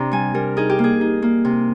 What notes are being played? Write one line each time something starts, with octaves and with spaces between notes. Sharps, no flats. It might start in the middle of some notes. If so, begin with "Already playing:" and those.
Already playing: C3 D4 A#5
G3 G#5
G3 A#4
D#4 G#4
G4
A#3
G#4
D#4
A#3
C3